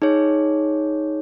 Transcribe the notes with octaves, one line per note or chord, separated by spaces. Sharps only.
D#4 G#4 C#5